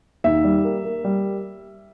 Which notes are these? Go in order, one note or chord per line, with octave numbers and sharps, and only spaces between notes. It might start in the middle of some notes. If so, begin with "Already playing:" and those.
D#2 E5
G3
A#3
A#3
G3